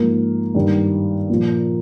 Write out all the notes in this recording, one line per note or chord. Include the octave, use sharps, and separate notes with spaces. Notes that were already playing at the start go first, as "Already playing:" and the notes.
Already playing: G#2 F3 A#3
G2 D#3 G3
A#2 F3